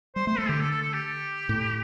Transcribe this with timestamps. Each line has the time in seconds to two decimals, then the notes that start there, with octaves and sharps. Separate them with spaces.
0.16 G3 C5
0.27 A3 C5
0.38 A3 A4
0.49 D3 G4
0.60 A4
0.71 A4
0.83 A4
0.94 G4
1.49 A2